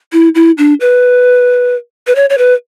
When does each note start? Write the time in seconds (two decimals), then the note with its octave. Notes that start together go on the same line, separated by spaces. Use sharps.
0.13 E4
0.35 E4
0.58 D4
0.81 B4
2.07 B4
2.16 C#5
2.30 C#5
2.38 B4